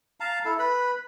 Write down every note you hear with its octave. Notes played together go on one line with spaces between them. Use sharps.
F5 A5 A#5
E4 A4
B4 B5